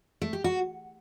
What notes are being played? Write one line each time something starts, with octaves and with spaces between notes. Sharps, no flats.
A3
G4
F#4